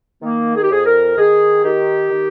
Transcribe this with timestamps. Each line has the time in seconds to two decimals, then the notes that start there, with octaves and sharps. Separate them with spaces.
0.22 D#3 A#3
0.55 G#4
0.62 G4
0.70 F2 G#4
0.86 A#4
1.17 D#3 G#4
1.64 D#3 G4
2.11 D#3